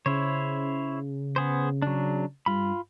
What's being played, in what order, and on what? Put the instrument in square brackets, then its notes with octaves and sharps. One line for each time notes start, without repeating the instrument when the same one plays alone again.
[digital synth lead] C#3 [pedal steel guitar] E4 C5 C#5
[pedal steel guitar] B3 G#4 C5
F#3 D4
[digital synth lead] G2 [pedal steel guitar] F4 B5